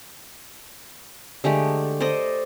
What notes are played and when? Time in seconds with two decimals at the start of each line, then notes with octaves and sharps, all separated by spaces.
1.44 D3 G#3 A3 G4
2.00 A4 C5 D5 D#5